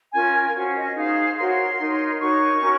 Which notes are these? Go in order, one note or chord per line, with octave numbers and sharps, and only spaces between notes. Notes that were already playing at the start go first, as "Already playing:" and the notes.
C#4 F4 A#4 G#5
C#4 F#4 C5
D#5
D#4 G#4 C5 F5
F#4 A#4 C#5 C6
D#4 A#4 C#5
D#4 F#4 A#4 C#5 C#6
C#4 F#4 A#4 C#5